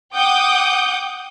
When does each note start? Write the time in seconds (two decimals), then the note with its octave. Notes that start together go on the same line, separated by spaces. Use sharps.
0.15 F#5 G5 D6 D#6 G6